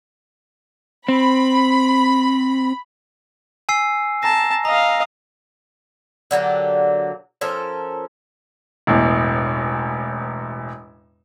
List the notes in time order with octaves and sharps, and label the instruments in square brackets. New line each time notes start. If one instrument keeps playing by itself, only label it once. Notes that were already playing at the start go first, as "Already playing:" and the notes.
[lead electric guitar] C4 [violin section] B5
[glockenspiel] G#5 E6 C7
[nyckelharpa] A5 [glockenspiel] A#5 A#6
[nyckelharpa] D#5 F5 [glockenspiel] A#5
[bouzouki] D3 F#3 A#3 G4
F3 C#4 A4 A#4
[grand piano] E1 A1 E2